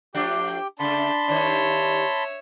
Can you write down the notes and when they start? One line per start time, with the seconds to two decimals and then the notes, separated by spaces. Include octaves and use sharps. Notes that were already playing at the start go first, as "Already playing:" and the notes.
0.15 F3 A3 D4 G4 G5
0.79 C#3 A3 D4 A5 B5 C6
1.28 G2 D#3 C#5 E5